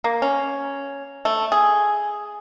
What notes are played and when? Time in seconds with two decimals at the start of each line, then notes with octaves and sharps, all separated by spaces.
0.04 A#3
0.22 C#4
1.25 A3
1.52 G#4